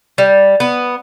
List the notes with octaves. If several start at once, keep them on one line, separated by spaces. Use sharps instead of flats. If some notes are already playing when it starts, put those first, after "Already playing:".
G3
B3